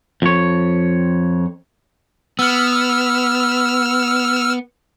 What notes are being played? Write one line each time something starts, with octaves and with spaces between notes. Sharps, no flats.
F2 C#5
B3 E6 F6